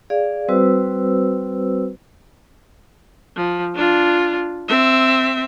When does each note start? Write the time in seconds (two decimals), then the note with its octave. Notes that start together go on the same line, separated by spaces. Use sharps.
0.10 G#4 D5 F5
0.48 G3 C4 F#4 B4 C5 E6
3.36 F3
3.75 D4 F4
4.68 C4 E5